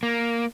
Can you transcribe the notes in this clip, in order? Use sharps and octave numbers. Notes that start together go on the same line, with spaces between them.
A#3